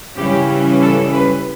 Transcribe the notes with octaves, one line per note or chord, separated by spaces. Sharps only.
C#3 E3 G3 C#4 G4
A4
B4